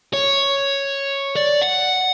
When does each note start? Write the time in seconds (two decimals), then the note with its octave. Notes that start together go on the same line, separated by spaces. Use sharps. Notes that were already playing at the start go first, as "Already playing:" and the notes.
0.13 C#5
1.36 D5
1.61 F#5